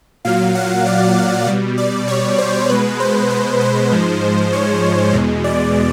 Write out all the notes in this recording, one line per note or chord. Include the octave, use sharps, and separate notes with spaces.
A#2 F#3 F5
F#5
D5
B2 G3
D5
C#5
C5
B2 G#3 B4
C5
B4
C5
G#2 F3 G#3
C#5
E2 B2 G#3
D5